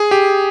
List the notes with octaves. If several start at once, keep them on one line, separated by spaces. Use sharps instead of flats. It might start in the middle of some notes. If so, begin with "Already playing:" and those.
Already playing: G#4
G4